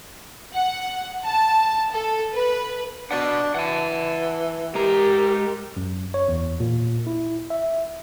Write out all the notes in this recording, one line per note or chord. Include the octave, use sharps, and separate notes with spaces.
F#5
A5
A4
B4
D4 F#4 B4 F#5
E3 F#5 A5
G#3 G4 A#4 A#5
F#2
C#5
E2
A#2
E4
E5